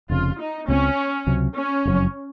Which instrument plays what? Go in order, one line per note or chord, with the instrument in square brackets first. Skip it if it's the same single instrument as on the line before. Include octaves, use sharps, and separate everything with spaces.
[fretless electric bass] F1 F2 C#3 [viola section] F4
[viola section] D#4
[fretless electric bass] C#2 C#3 F#3 C4 [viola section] C#4
[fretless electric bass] C#2 C3 F#3
[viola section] C#4
[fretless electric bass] F#1 F2 C#3 F#3